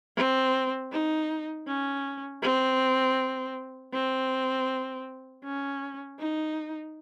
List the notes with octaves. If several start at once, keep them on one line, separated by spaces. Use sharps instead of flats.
C4
D#4
C#4
C4
C4
C#4
D#4